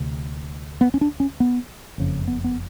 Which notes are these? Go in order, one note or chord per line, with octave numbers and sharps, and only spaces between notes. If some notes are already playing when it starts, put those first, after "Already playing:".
Already playing: D2 C3
B3
C#4
D4
C#4
B3
F#1 F2 C#3
B3
B3